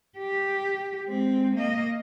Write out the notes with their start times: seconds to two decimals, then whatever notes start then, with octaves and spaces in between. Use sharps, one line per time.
0.18 G4
1.06 G#3 C4
1.56 A#3 D#5